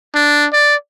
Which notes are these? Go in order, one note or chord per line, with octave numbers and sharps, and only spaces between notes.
D4
D5